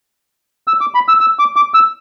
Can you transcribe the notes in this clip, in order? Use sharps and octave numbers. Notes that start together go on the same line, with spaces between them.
E6
D6
B5
E6
E6
D6
D6
E6